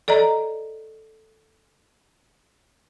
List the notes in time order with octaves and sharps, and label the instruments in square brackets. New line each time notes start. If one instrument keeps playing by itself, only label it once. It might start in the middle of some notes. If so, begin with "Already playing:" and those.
[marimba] A4 D5 D#5 A#5